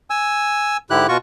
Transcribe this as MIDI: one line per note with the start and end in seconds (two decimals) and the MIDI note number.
0.10 0.77 80
0.10 0.77 88
0.90 1.07 44
0.90 1.07 50
0.90 1.07 64
0.90 1.07 67
0.90 1.07 90
1.09 1.17 47
1.09 1.17 65
1.09 1.17 66
1.09 1.17 85